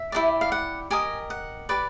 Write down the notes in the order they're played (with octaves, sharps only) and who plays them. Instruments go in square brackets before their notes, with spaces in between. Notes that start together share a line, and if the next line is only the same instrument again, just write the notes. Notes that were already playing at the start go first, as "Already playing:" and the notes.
Already playing: [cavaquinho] E5
E4 G4 A#4 D5
F5
F#5
G4 A#4 D#5 G#5
F#5
G4 B4 D5